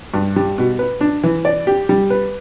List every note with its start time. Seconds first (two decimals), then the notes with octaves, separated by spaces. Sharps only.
0.14 G2
0.36 G3
0.58 B2
0.79 B4
1.01 D4
1.24 E3
1.45 D5
1.67 G4
1.89 G3
2.10 B4